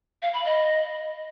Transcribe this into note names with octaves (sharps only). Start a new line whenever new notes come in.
F5
B5
D#5